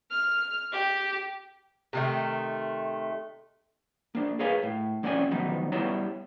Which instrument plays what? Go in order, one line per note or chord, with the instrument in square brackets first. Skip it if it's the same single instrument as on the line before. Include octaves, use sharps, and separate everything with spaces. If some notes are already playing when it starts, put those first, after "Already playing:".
[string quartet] F6
G4
[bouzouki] C3 D#3 A3
[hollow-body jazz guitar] A#3 D4
G#4 A#4 B4 C#5 F5 G#5
A2
F2 A#3 C#4 D5 F#5 G#5
D#3 F3 F#3 B3 D#4
G3 B3 E4 C#5 A5 A#5